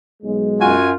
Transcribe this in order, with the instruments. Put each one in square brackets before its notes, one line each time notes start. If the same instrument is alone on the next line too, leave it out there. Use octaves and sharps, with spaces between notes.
[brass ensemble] B1 G#3
[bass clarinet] F#2 [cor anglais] F4 [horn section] F#4 G#5